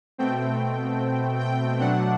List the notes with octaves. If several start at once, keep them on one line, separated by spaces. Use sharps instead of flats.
B2 A3 C4 G5
G5
B2 F#3 A3 D4 F#5